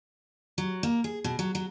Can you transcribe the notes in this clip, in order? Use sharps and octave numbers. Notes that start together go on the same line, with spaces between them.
F#3
A#3
G#4
B2
F#3
F#3